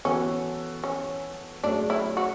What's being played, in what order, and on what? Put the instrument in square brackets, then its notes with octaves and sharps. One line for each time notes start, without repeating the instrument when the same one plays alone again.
[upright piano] E3 B3 F#4 A4 [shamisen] C#4
[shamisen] C#4
[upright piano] F#3 A3 C#4 G#4 [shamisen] D4
[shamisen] E4
F#4